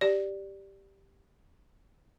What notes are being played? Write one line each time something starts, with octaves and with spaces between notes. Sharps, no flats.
G4 D5